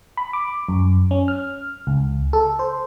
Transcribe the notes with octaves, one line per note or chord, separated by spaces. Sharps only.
B5
D6
F#2
C#4
F6
C#2
A4
C5